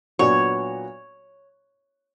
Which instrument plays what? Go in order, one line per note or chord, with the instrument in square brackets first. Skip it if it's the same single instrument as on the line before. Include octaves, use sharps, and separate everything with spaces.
[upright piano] A#2 F#3 B3 D4 F#4 [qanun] C#5